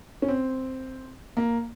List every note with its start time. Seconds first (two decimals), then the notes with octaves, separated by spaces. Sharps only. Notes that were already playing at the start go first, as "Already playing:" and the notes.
0.22 C#4
0.28 C4
1.37 A#3